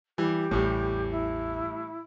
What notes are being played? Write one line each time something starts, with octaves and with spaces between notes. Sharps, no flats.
E3 G3 G4
A1 E2 A2 E3 G3
E4